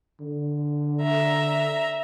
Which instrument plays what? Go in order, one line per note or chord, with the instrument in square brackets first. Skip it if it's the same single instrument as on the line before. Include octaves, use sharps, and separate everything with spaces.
[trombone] D3
[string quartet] E5 A#5